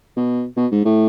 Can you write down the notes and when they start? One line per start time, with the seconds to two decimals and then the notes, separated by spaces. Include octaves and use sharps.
0.16 B2
0.57 B2
0.71 G#2
0.85 A2